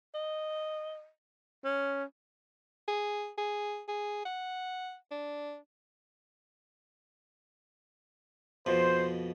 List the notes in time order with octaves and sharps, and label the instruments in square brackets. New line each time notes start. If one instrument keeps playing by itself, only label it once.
[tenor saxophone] D#5
C#4
[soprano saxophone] G#4
G#4
G#4
F#5
D4
[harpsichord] F2 B2 [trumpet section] C5